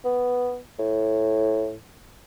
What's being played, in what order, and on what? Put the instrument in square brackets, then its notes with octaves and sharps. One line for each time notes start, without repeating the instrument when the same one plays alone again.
[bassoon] B3
A2